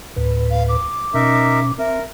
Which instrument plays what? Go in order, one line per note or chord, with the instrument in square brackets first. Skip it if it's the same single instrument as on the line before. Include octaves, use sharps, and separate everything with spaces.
[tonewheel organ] D2 A2 B4
[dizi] F5
D6
[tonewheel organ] B2 C#4 [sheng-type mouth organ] D#4 A#4 E5
[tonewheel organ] C4 [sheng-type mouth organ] A#4 [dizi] E5